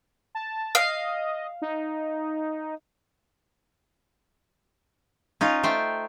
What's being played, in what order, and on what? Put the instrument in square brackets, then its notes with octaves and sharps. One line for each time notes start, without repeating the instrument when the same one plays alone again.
[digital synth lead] A5
[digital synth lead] D#5 [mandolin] F5
[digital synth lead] D#4
[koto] C#4 D#4 F4
A3 C5 G5